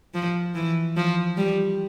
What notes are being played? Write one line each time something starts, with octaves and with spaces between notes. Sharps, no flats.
F3
E3
F3
G3